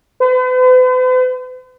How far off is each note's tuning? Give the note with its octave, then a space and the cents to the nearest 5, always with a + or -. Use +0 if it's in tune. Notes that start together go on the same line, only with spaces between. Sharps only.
B4 +45